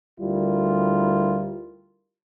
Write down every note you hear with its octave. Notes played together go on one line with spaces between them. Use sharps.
D2 G3 E4 F4 A#4